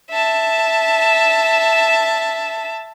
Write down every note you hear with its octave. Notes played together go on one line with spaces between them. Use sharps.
E5 A5